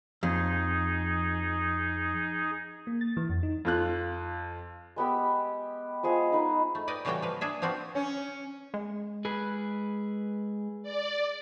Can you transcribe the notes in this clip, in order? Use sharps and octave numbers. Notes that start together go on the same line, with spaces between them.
F2 D#4 G#4
A#3
A6
E3
F2
D#4
F2 F4 F#6
G#3 B3 G4 E6
F3 G#3 G#4 D#5
D#4 B4
A3
B4 D5 D#5 G5
A2 C#3 E3 G3 F#4 G5
F3 B4
D4 G#4 E5
F3 B3 C4 D4 F#4
C#4
G#3
G#4 B4
D5